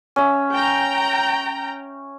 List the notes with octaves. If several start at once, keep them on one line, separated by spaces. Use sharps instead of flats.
C#4 E5
G5 A#5